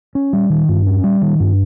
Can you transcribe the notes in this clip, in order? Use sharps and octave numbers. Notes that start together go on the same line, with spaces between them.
C#4
G3
D#3
G2
C#4
G3
D#3
G2